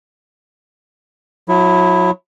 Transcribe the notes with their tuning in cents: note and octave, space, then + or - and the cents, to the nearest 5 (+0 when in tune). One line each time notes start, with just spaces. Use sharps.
F#3 -30 E4 +0